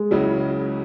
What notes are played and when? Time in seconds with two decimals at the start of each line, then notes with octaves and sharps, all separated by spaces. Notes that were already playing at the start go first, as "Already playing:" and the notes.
Already playing: G#3
0.11 C#2 C#3 F#3 C#4 E4